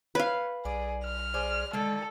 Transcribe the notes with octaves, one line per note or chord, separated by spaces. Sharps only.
B4 C#5 F5
B1 G#4 D5
F6
G#4 C5 D5
D3 D#3 G#3 A4